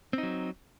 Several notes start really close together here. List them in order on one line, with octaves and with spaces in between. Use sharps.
C4 D#4 F#3